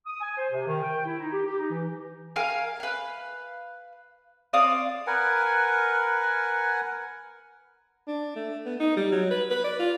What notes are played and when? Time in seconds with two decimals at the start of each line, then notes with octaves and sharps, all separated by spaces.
0.06 D#6
0.21 G#5
0.37 C5
0.51 C3
0.67 D#3
0.82 G5
1.05 E4
1.19 D#4
1.33 G4
1.46 G4
1.58 D#4
1.71 E3
2.36 A#4 F5 G#5 F6
2.80 B4 F5
4.53 C4 D5 F5 D#6
5.07 A#4 B4 F#5 G#5
8.07 D4
8.36 A3
8.65 B3
8.80 D#4
8.96 G3
9.12 F#3
9.30 B4
9.50 B4
9.64 D5
9.79 F4